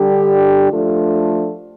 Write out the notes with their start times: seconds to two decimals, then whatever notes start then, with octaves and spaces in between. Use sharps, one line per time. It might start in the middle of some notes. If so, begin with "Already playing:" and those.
Already playing: D3 G3 D4 G4
0.71 F3 A3 D4 F4 A4